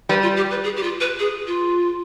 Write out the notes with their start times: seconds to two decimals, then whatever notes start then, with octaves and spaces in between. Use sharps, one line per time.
0.09 G3 B4
0.22 F4
0.37 G4
0.51 B4
0.64 G#4
0.76 G4
0.83 F4
1.00 B4
1.19 G#4
1.47 F4